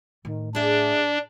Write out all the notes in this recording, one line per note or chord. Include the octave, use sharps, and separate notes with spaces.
A2 D#3
D4 G#4 D5 E5